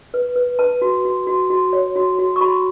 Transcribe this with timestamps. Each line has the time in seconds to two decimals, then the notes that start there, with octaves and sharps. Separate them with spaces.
0.14 B4
0.36 B4
0.59 B4 A5
0.82 F#4
1.05 F#4
1.27 F#4
1.50 F#4
1.73 C#5
1.96 F#4
2.19 F#4
2.36 C#6
2.41 F#4 B5